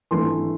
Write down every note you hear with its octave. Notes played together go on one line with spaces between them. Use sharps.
G#1 G2 E3 A3 C6